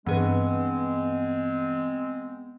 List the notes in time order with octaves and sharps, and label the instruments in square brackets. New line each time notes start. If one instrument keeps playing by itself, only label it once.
[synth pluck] G2 B4 [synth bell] E3 G#4 [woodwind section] G#3 C4 [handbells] B3